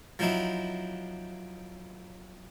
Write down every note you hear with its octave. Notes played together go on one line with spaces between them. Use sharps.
F3 F#3 C4 D#4 E4 F#4